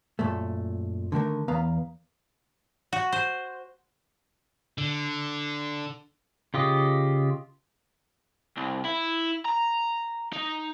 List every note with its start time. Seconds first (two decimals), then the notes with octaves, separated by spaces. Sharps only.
0.19 F#2 A#2 A3
1.12 D3 D#3 A3 A#4
1.48 E2 B3 B4 F5 A#5
2.93 F#4
3.12 C5
4.78 D3
6.54 C#3 F4 G4 D#5
8.57 C2
8.84 E4
9.45 A#5
10.33 D#4